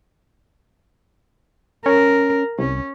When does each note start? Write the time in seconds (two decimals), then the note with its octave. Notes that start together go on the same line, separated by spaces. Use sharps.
1.86 C#4 A#4
2.59 C2 C#4